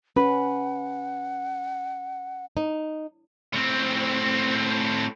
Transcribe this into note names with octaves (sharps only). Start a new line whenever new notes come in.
C#4 B4 F#5
D#4
A2 C4